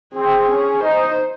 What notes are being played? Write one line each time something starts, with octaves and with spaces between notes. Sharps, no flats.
C4 G#4
C#4
D#4 C5